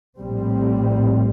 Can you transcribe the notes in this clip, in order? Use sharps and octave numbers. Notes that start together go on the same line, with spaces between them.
A#1 A2 G3 C4